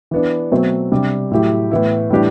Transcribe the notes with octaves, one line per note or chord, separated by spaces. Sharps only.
E3 B3 D4
B2 F#3 A3 C4
C3 G3 D4
A2 F#3 A3 E4 G4
A2 E3 B3 E4
A2 E3 G3 D4 G4